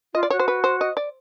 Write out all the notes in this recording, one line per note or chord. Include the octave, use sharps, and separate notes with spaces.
F4 D#5
D5
F#4 C#5
C5
B4
C5
D#5
D5